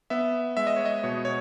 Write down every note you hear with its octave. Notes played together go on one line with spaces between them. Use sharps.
B3 E5
G#3 E5
D#5
C#5
D#5
B2 C#5
C#5